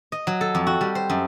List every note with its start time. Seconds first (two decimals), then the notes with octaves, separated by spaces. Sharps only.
0.12 D#5
0.27 F#3
0.41 A4
0.55 F2
0.67 F#4
0.81 G3
0.95 C5
1.10 F#2